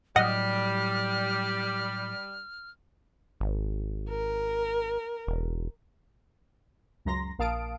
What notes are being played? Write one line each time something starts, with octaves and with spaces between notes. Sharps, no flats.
A2 F#3 G3 D#5 F#5 F6
G#1
A#4
E1
C#2 F#2 A#5 C6 A#6
A#1 A#3 F5 A5 D#6 D7